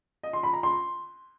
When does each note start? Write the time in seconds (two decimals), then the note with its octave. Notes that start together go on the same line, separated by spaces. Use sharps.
0.23 D#5
0.33 C6
0.43 B5
0.53 A#5
0.63 C6